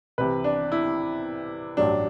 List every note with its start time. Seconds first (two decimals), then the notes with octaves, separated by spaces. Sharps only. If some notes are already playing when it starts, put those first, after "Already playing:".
0.18 C2 C3 E3 B4
0.44 D4
0.72 E4
1.77 A1 G2 F#3 D4